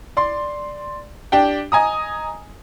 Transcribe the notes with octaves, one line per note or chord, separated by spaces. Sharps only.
D5 C6
D4 G4 G5
D#5 G#5 A#5 D#6